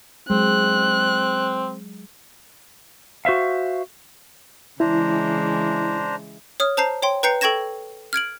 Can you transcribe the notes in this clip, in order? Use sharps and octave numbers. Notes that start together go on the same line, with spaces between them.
F#3 G#3 C4 F#6
F#4 C5 E5 F5
C#3 E3 G#3 D4 E4 C5 A#5
C#5 D#6 F6
C5 A5 A#5 G6 C7
C#5 G5 C6
B4 G5 A#5 G6 C7 C#7
A4 G5 C#6 G#6 A#6 E7
F6 G#6 D7 F#7